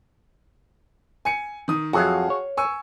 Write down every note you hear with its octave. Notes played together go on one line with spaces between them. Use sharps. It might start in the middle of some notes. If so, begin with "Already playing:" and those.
G#5 C#7
D#3 D#6
F2 F#3 F#4 G#4 E5 F5
C#5
G#5 C#6 E6